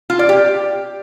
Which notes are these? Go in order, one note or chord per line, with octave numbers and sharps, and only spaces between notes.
F4
D5
G4